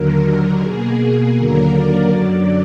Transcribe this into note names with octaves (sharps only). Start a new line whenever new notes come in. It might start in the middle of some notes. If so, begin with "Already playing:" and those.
Already playing: D#2 D3 F#3 A#4
B2 A#3 G#4
D#2 D3 F#3 A#3 A#4
D5
F#2 D3 F#3